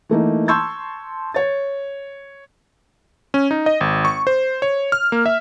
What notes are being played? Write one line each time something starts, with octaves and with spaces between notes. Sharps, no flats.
E3 A3 A#3 D#4
A5 C6 C#6 E6 G6 G#6
C#5 A6
C#4
D#4
D#5
G#1
C#6
C5
C#5
F6
A#3
E5